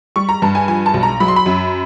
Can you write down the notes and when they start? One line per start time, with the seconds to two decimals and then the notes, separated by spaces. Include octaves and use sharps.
0.16 G3 C#6
0.29 A#5
0.42 G2 A5
0.55 G#5
0.68 F3 G#5
0.86 A5
0.94 B1
1.03 A#5
1.20 F#3 B5
1.28 C6
1.36 B5
1.46 F#2